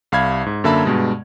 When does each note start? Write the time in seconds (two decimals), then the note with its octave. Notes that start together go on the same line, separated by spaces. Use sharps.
0.12 C2 F5 B5 G#6
0.46 G#2
0.64 F#2 D3 A#3 E5 A5 B5
0.85 G2 B2 G#3